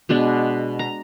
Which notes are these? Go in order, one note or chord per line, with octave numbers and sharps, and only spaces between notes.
B2 G#3 D4
A#5